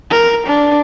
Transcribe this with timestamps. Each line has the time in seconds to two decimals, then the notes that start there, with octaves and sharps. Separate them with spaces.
0.10 A#4
0.46 D4